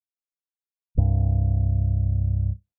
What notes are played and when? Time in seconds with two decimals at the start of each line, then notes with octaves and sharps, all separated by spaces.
0.97 C2 G2